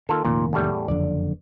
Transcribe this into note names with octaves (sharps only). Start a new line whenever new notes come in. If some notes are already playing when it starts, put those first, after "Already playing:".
D#3 A#3 F4 A4
F1 A#2 D#3 A#3
E2 A2 G3
F#1 F2 D3 D5